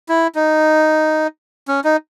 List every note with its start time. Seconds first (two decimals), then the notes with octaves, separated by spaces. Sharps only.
0.09 E4
0.35 D#4
1.68 C#4
1.84 D#4